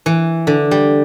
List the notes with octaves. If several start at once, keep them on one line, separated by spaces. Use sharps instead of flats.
E3
D3
G3